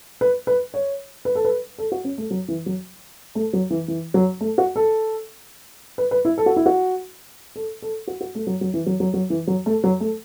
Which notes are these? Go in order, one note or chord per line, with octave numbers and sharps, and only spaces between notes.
B4
B4
C#5
B4
A4
B4
A4
F#4
C#4
A3
F#3
E3
F#3
A3
F#3
E3
E3
F#3
A3
F#4
A4
B4
B4
E4
A4
F#4
E4
F#4
A4
A4
F#4
F#4
A3
F#3
F#3
E3
F#3
F#3
F#3
E3
F#3
A3
F#3
A3